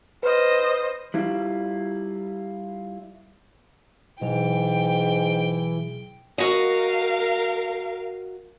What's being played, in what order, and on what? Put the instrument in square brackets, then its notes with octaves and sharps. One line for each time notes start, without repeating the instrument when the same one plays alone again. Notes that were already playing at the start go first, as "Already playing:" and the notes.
[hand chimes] B4 F6 [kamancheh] C5 D#5
[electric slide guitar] G3 E4 F4
[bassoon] G#2 [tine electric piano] B2 F#3 G#4 [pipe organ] E3 [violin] G5
[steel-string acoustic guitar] F#4 D#5 [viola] A#4 F5